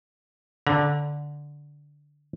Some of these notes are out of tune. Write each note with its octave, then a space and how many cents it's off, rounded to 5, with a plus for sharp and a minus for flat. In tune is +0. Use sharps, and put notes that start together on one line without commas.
D3 -5 A#5 +40